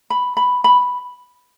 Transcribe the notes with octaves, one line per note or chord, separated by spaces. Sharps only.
B5
B5
B5